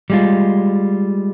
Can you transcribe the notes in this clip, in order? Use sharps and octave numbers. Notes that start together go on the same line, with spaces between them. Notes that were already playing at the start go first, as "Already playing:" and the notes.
G3 G#3 F4